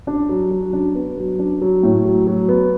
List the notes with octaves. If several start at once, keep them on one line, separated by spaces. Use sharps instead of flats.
D4
F#3
F#3
D4
B3
F#3
D4
F#3
A2
F#3
F#3
B3